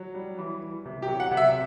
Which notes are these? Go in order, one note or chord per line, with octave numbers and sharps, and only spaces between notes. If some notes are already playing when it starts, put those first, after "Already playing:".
Already playing: F#3
G3
E3
E3
C3
G4
F#3
F#5
C3
E5